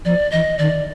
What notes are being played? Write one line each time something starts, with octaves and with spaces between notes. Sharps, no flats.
F3 D5
E3 D#5
D#3 D5